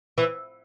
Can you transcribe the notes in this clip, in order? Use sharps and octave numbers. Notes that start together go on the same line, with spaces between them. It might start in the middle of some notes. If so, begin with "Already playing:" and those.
E3